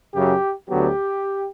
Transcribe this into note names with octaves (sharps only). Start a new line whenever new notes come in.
F#2 C#3 F#3 G4
D2 D3 F#3 B3 G4